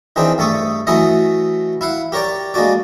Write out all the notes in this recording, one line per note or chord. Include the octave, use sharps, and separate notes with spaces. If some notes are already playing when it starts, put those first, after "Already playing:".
D#3 E3 C4 D4 G#4 C5
G2 A3 A4 C#6 D#6
E3 F#3 A3 C#4 E4 D#5
E4 F5 F#5
G4 A#4 C#5 D5 G5
G#3 A#3 D4 F#4 D5